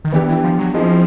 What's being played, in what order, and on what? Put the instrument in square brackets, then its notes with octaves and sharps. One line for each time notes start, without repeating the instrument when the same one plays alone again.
[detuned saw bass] D#3
[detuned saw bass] E3 [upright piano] B3 D4 G4
[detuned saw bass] E3
F3
F#3
[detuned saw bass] F3 [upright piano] C4 E4 G#4 C5 D#5